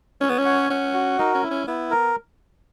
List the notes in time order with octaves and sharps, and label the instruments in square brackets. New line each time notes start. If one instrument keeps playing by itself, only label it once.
[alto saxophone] C#4 [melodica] C#5
[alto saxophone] B3
C#4
[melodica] F#5
[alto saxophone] C#4 [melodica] F#5
[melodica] F#4
[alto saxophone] D#4 [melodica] A#4
[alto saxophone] C#4
[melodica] E4
[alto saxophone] C#4
[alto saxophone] B3 [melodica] E4
[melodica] A#4